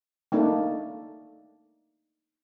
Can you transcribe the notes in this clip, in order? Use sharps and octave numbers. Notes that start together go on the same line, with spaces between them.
A3 A#3 D4 D#4